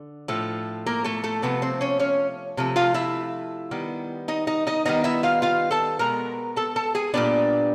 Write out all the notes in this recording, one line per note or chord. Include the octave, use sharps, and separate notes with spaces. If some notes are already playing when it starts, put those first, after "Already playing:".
Already playing: D3
A2 F3 A3
A#3 A#4
A3 A4
A3 A4
C3 F3 A3 B3 B4
C4 C5
C#4 C#5
C#4 C#5
C3 F3 A3
F4 F5
E4 E5
D#3 G3 B3
D#4 D#5
D#4 D#5
D#4 D#5
D#3 G3 B3 D#4 D#5
E4 E5
F4 F5
F4 F5
A4 A5
B2 G#3 B3 A#4 A#5
A4 A5
A4 A5
G#4 G#5
A#2 G3 B3 D4 D5